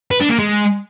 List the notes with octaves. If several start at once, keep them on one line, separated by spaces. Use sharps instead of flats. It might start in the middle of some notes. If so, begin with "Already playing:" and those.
B4
D4
A#3
G#3